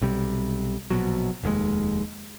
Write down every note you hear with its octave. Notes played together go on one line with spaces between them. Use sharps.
B1 C3 G3
A#1 B2 F#3
F1 D#2 C3 G#3